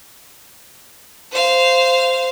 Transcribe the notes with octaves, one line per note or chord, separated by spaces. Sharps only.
C5 F5